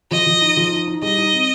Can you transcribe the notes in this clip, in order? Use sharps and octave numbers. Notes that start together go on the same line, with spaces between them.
F3 D#5
F3
D#4
F3
D#4
D#4
G3 D#5
D#4
C4